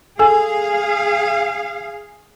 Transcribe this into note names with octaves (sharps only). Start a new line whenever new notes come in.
G#4 A4 F5 G#5